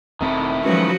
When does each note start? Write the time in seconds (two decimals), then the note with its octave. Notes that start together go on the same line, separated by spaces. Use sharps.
0.21 E1 D#3 A3 C4 E4
0.65 F3 F#3 G#3 C#4 F#4 B4